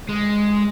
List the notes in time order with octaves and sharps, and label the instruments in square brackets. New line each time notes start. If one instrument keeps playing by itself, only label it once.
[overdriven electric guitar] G#3